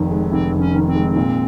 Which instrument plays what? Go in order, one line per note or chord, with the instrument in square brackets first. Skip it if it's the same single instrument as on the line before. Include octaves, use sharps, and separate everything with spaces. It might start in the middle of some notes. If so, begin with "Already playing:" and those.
Already playing: [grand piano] F1 F2 D#3
G#3
[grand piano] F1 [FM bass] C4
[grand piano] F2
[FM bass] C#4
[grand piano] D#3
[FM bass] C4
[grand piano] G#3
A#2